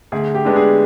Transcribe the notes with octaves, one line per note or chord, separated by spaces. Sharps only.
D2 G#4
G4
D3 G#3 B3 D4
G#4